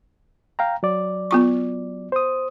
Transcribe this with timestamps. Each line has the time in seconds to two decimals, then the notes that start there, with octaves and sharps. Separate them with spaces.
0.59 F5 G5 A#5
0.83 F#3 D5
1.31 B3 F4 C#6
2.12 C5 D#6